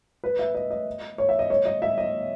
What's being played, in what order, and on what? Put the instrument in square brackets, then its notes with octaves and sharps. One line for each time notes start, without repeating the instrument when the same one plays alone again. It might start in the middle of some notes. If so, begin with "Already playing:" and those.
[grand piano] B4
E5
D#5
D#5
C#5
E5
D#5
C#5
D#5
E5
D#5